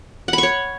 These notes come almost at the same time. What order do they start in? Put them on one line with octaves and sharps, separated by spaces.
F#5 B5 C#6 C#5